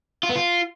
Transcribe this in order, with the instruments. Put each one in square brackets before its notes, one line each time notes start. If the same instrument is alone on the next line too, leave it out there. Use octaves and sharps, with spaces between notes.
[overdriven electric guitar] F4
B3
F4